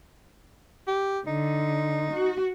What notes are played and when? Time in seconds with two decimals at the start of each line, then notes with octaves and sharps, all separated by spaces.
0.87 G4
1.27 D3 D#4
2.13 F#4